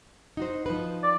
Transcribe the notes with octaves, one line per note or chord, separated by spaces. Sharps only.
D#4 F#4 C5
F3 D#4 B4
D5